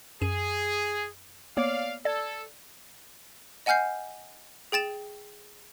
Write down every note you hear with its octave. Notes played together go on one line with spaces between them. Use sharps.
F#2 G#4 D#7
A#3 B3 C#5 D5 F5
A4 D5 G#6
D#5 F#5 G#5 F6 G6 C7
G#4 G5 A6 E7